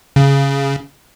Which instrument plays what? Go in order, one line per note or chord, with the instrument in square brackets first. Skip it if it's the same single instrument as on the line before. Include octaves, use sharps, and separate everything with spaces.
[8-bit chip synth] C#3